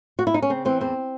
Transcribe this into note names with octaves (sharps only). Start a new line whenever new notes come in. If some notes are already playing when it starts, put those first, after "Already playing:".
F#4
E4
D#4
C#4
C#3 C4
E3 C4
E2 C4